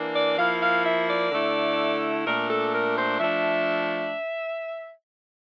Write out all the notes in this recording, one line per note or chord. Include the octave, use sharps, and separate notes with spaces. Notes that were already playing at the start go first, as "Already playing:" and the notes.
Already playing: E3 A#3 D4
D5
F3 A#3 E4 F5
F5
E5
D5
D3 A3 E4
A#2 A3 D4 A#4
A4
A#4
C5
F3 A3 D4 E5